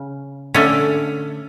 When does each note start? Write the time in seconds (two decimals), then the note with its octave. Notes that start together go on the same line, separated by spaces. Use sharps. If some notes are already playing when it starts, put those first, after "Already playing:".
Already playing: C#3
0.54 D3 A3 C#4